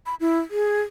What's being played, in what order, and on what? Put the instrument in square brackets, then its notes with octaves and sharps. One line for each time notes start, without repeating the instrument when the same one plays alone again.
[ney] B5
E4
G#4